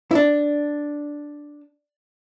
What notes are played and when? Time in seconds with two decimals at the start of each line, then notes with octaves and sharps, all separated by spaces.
0.11 E4
0.15 D4